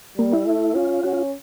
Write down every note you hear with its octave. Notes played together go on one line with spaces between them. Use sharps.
G3 A#3
E4
A3
C#4 F4
C#4 F#4
F4